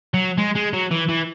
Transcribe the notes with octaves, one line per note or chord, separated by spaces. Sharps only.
F#3
G#3
G#3
F#3
E3
E3